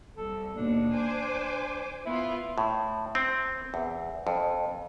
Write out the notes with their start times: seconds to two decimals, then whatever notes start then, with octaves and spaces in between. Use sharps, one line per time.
0.17 C2 A4
0.56 D#2 B2 D4
0.93 C5 G#5 D6
2.06 B3 E4 F4
2.58 A2
3.15 C4
3.74 E2
4.27 F2